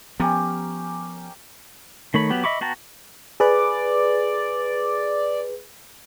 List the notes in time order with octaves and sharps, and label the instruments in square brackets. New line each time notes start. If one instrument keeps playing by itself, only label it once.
[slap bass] F3 B3 [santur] C#4 G4 A#4
[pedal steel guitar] D#3 A3 C#5 B5
F#3 B3 G4
D#5 E5 B5 C#6 D6
B3 F#4 G5 A5 A#5
[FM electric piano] G#4 B4 [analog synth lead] D5